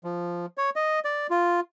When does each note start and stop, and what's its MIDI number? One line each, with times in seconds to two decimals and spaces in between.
0.04 0.46 53
0.58 0.70 73
0.76 0.99 75
1.05 1.27 74
1.30 1.60 65